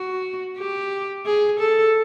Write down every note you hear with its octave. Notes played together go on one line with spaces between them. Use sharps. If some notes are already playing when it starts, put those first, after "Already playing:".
Already playing: F#4
G4
G#4
A4